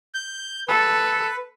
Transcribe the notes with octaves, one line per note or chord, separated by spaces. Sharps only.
G6
A4 B4